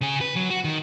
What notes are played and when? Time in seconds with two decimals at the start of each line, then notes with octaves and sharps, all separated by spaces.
0.01 C#3 G#5
0.21 B4
0.36 F#3
0.50 F#4
0.64 D#3